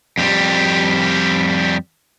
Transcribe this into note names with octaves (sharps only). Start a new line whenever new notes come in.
F2 G3